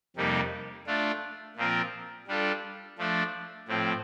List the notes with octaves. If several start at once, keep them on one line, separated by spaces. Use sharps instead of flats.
F2 C3 G3 A#3 D#4
A3 D4 F4
A#2 F3 C4 F4 A#4
G3 D4 F4 A4
F3 A3 D4
A2 F3 C4